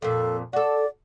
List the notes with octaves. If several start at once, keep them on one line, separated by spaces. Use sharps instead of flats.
F2 A#2 A4
F#4 A4 D5